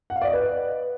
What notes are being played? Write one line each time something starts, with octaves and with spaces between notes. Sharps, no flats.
F#5
F5
D5
D#5
B4